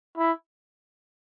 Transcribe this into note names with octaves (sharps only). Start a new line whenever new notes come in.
E4